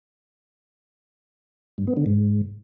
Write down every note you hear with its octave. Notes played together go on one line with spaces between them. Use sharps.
G2
B3
D3
G#2